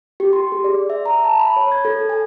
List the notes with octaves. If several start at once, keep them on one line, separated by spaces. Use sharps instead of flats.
G4
C6
G#4
D5
E5
A#5
A5
B5
C#5
G#6
A4
G#5